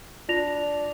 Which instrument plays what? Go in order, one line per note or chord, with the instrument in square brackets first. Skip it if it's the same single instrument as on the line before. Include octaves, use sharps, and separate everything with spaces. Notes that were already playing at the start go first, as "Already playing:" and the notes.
[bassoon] D4 [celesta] F4 A#6 F7